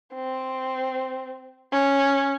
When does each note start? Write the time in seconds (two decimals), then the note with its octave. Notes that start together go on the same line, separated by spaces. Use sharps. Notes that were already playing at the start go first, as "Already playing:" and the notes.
0.15 C4
1.73 C#4